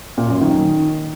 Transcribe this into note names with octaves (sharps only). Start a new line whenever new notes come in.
A#2
F#2
D#3